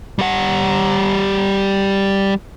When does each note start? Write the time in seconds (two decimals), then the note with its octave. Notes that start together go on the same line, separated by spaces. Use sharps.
0.19 G3 F#5